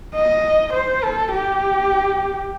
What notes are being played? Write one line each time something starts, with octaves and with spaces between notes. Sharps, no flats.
D#5
C5
A4
G4